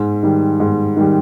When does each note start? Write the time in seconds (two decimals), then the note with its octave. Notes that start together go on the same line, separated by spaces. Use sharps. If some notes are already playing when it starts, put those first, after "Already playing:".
Already playing: G#2
0.23 D#3 G3
0.60 G#2
0.97 D#3 G3